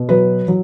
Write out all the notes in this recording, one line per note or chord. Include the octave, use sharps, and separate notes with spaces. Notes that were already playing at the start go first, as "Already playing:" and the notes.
Already playing: B2
F#3 B4
F#3